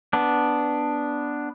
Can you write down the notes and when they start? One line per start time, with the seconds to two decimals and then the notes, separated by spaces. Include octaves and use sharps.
0.13 B3 D4